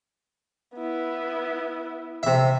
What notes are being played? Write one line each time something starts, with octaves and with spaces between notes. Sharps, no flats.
B3 E4
C3 E5